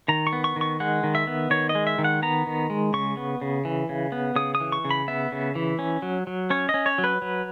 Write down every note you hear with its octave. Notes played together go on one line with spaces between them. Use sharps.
D#3 A#5
C#6
B3
C#6
D#3
C#6
G#3 F#5
D#3
E5
B3
D#3 C#5
D#5
G#3
E5
D#3
F#5
B3 A#5
D#3
G#3
C#3 C#6
B3
C#3
E3
C#3
B3
C#3 D#6
D#6
E3
C#6
C#3
B5
B3 E5
C#3
E3
C#4
F#3
F#3
C#4 C#5
D#5
C#4
C#5
F#3
B4
F#3